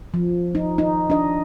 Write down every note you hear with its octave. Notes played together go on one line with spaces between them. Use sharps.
F3
D#4
D#4
D4 D#5